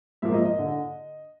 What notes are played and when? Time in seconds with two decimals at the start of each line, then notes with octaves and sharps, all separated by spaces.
0.22 G#2 F3 A#3 E5
0.34 D#5
0.45 D#5
0.59 D3